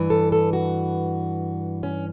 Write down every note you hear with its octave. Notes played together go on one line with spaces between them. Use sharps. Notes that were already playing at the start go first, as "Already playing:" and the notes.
Already playing: G2 E3
A4
A4
F#4
C#4